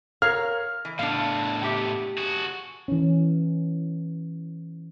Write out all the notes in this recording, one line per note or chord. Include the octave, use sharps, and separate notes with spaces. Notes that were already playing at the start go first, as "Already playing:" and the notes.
A#4 C#5 F5 F6
E3
A2 B3 D4 F5
G4 E5
F#4 G#4
E3 C#4